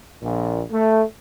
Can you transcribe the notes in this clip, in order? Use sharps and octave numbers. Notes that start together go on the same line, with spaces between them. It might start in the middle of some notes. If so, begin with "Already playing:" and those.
A#1 A#2
A3